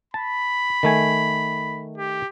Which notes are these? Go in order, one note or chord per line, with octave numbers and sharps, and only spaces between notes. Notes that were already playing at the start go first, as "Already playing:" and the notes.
A5 B5
D#3 A3 G#5
G4